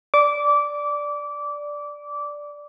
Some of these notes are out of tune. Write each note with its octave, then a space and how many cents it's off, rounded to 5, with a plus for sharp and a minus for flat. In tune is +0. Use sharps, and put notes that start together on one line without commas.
D5 +0 D6 -20